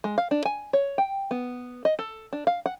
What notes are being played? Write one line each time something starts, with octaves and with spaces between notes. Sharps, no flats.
G#3
F5
D4
G#5
C#5
G5
B3
D#5
A4
D4
F5
F#5